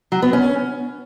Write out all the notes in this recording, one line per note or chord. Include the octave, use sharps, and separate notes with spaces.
F#3
B3
C#4